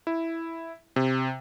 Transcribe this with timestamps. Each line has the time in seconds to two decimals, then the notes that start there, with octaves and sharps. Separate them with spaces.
0.07 E4
0.96 C3